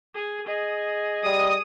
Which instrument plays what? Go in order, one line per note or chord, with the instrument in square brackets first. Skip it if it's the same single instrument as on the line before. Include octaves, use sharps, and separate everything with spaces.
[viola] G#4
[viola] G#4 [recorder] D#5
[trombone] G3 [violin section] D#6